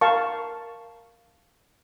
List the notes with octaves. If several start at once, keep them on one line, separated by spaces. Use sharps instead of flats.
A#4 F5 A5 C#6